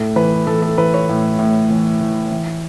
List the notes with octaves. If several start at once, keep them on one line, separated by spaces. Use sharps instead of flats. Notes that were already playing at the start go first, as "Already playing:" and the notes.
Already playing: A2 A4
E3 B4
E3 A4
A4
E3 B4
C#5
A2
A2
E3
E3
E3